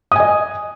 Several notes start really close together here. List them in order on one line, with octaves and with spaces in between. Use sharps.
D#6 G#5 D#5